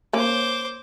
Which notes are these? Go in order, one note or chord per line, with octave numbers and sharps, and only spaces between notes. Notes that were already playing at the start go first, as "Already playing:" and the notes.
A#3 C#4 C5 D6